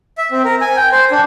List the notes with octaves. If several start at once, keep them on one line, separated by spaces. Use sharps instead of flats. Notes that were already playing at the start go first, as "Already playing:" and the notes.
E5
C4
A#4
G#5
G5
C5
D4